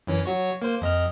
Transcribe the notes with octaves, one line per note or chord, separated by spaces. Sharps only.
F#2 E3 C#4
F#3 F#4 C#5
A#3 C5
F2 D#5 F6